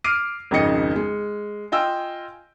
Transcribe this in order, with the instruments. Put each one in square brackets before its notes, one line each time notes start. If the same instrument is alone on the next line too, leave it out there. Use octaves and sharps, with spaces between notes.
[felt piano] D6 F6 C7 D7 D#7
G#1 F2 C#3 D#4 D#5 C#7
G#3
F4 D#5 G5 G#5 E6